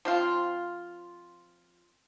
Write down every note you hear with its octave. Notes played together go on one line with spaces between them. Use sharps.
F3 C4 F4